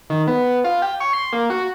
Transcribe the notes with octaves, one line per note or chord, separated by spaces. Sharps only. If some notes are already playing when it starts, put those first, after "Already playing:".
D#3
B3
F4
G4
C#5
C6
A#3
F#4